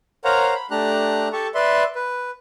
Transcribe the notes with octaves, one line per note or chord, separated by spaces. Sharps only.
A#4 C5 C#5 F5 F#5 A#5
B5
A3 D4 G4 A#5 F#6
G4 A4 A5 C#6
B4 D5 E5 C6
B4